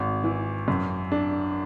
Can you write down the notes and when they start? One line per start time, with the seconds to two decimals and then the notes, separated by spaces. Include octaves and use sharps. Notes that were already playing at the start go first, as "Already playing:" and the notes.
Already playing: G#1
0.24 E3
0.68 F#2
1.12 D4